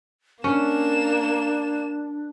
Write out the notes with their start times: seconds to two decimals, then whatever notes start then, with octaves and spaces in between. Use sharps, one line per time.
0.44 A#3 C#4 D4 E7